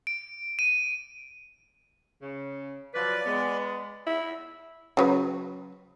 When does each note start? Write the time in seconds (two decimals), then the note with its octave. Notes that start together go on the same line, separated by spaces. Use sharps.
0.07 D7
0.59 D#7
2.22 C#3
2.94 F3 F#3 B4 D5
3.26 G#3 B3
4.07 E4
4.97 C#3 F#3 B4